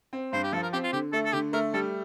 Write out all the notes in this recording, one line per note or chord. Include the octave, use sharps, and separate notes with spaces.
C4
G2 C5
G4
F3 A4
A#4
C4 G4
F4
D3 G4
A3 A4
A4
D3 G4
A3 A#4
G3 A4